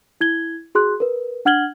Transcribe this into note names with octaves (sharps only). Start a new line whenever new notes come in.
E4 G#6 G7
F#4 G#4 C6 F#6
A#4 B4
D4 F#5 F6 G#6 F#7 G7